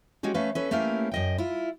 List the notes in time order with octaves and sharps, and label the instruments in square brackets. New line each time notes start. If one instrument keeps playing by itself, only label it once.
[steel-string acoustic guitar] G#3 C#4 F#4 G4
A3 C#4 B4 F5
C#4 A4 B4
A3 A#3 C#4 E4 G4 F5
F#2 D#5 G5
E4 F4